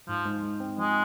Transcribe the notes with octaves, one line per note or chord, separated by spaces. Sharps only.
G#2 F3
G#2
G#3
C4
F3 G#3